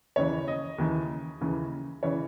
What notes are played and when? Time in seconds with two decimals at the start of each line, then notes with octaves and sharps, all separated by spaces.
0.16 D#2 C#3 E3 C#5
0.48 D#5
0.78 D#2 C#3 E3
1.41 D#2 C#3 E3
2.03 C#3 E3 C#5